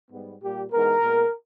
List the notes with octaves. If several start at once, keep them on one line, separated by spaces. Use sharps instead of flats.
G#2 G3 B3
A#2 G3 A#3 G4
G#2 E3 G#3 B3 A#4
A#2 G#3 B3